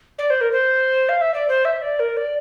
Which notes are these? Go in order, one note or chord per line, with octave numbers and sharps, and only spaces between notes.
D5
C5
A#4
C5
F5
E5
D5
C5
E5
D5
A#4
D5